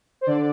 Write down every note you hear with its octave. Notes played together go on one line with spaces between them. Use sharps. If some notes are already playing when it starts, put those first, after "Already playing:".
C5
D3 D5